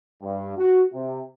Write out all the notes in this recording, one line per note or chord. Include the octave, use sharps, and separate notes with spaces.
G2
F#4
C3